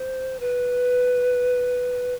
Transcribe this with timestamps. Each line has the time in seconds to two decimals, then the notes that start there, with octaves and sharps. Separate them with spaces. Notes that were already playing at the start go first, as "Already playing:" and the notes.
Already playing: C5
0.40 B4